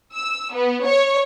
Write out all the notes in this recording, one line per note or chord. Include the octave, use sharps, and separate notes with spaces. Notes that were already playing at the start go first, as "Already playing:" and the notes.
E6
B3
C#5